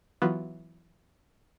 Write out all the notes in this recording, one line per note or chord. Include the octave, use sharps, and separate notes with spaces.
E3 F#3 B3 F4 F#4